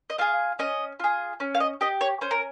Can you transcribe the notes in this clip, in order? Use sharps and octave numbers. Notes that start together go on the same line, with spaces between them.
D#5
F4 G#4 F5
C#4 D#5
F4 G#4
C#4
F5
D#5
G4 D#5
C#5
C#4 C5
A#4